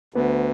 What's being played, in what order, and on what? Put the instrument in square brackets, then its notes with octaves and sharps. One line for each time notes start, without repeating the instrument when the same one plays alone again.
[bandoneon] D2 [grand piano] B3